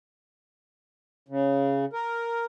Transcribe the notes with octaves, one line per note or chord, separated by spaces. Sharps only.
C#3
A#4